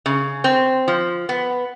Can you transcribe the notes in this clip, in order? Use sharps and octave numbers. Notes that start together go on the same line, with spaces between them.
C#3
C4
F3
B3